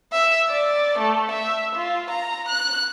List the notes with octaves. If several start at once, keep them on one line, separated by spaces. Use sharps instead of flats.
E5
D5
A3
E5
F4
A#5
F#6